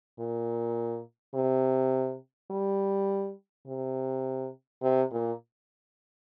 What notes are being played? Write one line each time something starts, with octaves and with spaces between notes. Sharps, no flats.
A#2
C3
G3
C3
C3
A#2